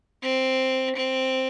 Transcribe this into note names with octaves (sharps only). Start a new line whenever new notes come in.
C4
C4